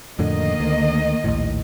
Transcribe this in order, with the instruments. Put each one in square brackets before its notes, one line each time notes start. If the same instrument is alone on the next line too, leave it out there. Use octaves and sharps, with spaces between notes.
[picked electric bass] F2 A2 D3 [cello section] D#3 A#3 D#5
[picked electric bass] D2
A#1 D#2 A2